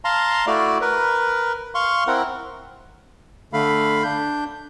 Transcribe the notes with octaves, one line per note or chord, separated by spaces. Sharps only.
F5 A5 A#5 C6
A3 E4 F#4 D5
A#4 B4
F5 C6 C#6
C4 E4 A#4 F#5
D3 A3 F5 B5
D4 G6